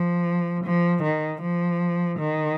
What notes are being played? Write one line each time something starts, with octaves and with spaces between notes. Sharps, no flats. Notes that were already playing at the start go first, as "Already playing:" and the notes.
Already playing: F3
F3
D#3
F3
D#3